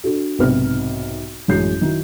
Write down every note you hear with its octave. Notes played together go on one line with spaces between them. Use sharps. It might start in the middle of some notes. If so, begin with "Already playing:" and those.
D4 F#4 A4
B1 G#2 C3 B4 F6
A1 F#2 G#3 G6 C7
D#3 F#3 E4